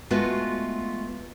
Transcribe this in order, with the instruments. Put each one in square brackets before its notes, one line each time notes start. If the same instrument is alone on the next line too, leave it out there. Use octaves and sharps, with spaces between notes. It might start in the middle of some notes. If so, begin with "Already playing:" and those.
[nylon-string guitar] G#3 A3 B3 F4 F#4